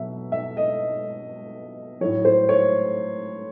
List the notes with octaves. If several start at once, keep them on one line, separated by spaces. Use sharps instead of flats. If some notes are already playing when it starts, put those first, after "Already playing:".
Already playing: B2 F#3 E5
E5
D#5
A2 F#3 C#5
C5
C#5